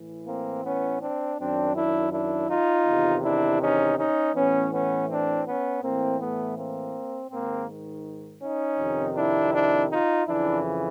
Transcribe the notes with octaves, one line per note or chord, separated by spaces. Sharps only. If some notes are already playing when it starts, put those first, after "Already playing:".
Already playing: A2 E3
A#3 C4
B3 C#4
C4 D4
F#2 D#3 C4 D4
D4 E4
D4 E4
D#4 F4
E2 C3 D#3
D4 E4
C#4 D#4
C#4 D#4
A2 E3 B3 C#4
B3 C#4
C4 D4
B3 C#4
A2 E3 A#3 C4
A3 B3
A#3 C4
G#2 D#3 A#3 C4
C#4 D#4
F2 C3 D#3
D4 E4
D4 E4
D#4 F4
F2 C#3 E3 D4 E4